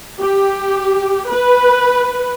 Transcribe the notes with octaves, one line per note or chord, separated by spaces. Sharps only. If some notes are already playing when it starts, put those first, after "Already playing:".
G4
B4